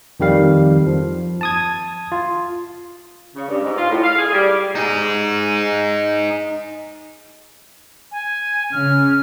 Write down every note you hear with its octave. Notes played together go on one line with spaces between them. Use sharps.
F2 D#3 G3 F5
F3
A5 D#6 G#6
F4
C#3
G2
G#2
F4
A2
F5
G#4
G3
D#4 G#4
G#5
C#3 F6